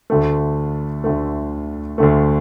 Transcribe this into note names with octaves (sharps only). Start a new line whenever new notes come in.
D2 D3 A3
D2 D3 A3
D2 D3 A3